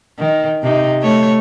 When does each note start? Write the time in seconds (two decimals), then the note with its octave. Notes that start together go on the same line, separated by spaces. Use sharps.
0.19 D#3
0.63 C3 D#4
1.02 A3 C#5